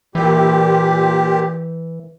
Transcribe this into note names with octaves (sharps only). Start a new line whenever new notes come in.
A#2 E3 G4